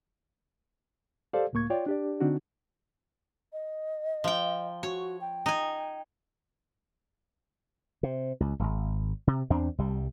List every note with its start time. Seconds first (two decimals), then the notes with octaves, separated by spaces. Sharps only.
1.33 G4 A4 C5 D5 F5
1.53 C#2 A2 A#3 C#6 G#6
1.70 F4 C#5 D5 G5
1.86 D4 G4 D5
2.20 D3 C4 D4 D#4 F#4
3.53 D#5
4.24 F3 G5
4.83 F#4 C#5
5.21 G5
5.46 D#4 G#5
8.03 C3
8.40 C#2
8.59 D#1 G#1
9.27 C3
9.50 E2 C4 D4
9.78 C2 G3